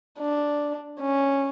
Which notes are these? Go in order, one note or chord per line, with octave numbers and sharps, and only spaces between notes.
D4
C#4